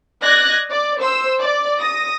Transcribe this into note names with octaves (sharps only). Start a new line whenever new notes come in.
D5 D#5 F#6 G#6 A#6
D5
C5 E6
D5
D#6 A#6